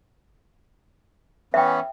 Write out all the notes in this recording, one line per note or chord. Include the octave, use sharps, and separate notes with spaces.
E3 B3 C#4 E5 G5